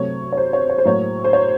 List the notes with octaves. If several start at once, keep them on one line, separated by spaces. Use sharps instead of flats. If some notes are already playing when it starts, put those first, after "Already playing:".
Already playing: C3 F#3 A3 C4 C#5
C#5
C5
C#5
C#5
C5
A2 F#3 A#3 C#5
C5
C#5